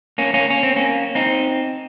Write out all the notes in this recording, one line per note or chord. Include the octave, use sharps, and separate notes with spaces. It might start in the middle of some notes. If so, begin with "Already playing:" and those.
A#3 C#4
A#3 C#4
C#4
C4
A#3 C#4
C4 D#4